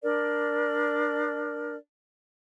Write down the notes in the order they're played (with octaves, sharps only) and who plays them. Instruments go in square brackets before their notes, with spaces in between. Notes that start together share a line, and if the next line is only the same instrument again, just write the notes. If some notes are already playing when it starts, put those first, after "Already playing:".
[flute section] D4 A#4 D5